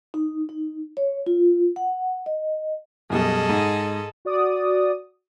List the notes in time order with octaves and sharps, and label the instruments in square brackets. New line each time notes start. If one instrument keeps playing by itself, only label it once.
[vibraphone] D#4
D#4
C#5
F4
F#5
D#5
[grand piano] F#2 B2 G3 [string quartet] G#4 A4 D#5
[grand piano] G#2
[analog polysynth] F#4 D5 D#6